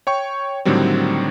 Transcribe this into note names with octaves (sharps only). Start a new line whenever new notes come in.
C#5 G5 C#6
A2 D3 D#3 F#3 G3 C4